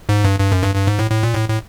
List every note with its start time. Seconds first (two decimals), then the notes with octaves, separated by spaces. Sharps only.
0.09 G#2
0.24 G2
0.40 G2
0.52 F#2
0.64 G2
0.75 G2
0.87 G#2
0.99 A2
1.11 A2
1.23 A#2
1.35 A2
1.49 A2